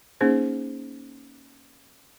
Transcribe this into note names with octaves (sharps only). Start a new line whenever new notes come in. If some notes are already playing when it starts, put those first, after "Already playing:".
A#3 C#4 D#4 G#4 C5